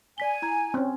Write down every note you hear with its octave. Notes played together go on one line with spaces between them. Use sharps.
D5 G#5 B6 G7
E4 A#5 G#6
C4 C#4